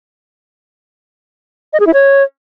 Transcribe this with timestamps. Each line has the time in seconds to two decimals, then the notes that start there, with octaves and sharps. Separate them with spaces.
1.73 D#5
1.80 G#4
1.87 E4
1.94 C#5